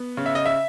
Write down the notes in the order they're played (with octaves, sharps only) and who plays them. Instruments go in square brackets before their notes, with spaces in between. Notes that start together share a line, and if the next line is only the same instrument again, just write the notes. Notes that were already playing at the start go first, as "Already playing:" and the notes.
Already playing: [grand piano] B3
C#3
E5
D#5
E5